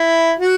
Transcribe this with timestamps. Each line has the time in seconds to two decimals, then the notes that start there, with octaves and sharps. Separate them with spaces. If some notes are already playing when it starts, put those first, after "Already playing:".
Already playing: E4
0.39 F#4